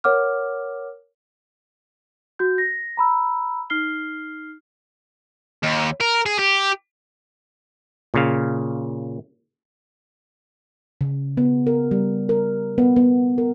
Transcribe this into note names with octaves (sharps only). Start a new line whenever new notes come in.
A#4 C#5 F#5 D6 F6
F#4 G6
A#6
A#5 B5 E6
D#4 F6 C7 G7
D#2
A#4
G#4
G4
A#2 C#3 F5
C#3
B3
A#4
G3
A#4
B3
B3
A#4